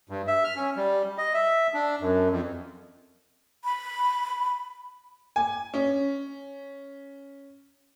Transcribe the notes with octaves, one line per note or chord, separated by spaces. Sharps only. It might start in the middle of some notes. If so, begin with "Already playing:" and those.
G2
E5
F6
C#4
G3
D#5
E5
D4
F#2
F2
B5
G#5
C#4